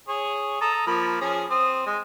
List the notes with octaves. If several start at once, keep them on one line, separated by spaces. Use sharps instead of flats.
G#4 C#5
A4 A#5 D#6
F3 A#3 B5
F3 C#4 G#4
C4 D#6
G#3